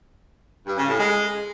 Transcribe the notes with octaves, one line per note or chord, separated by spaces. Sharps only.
G2
C#3
A2
G#3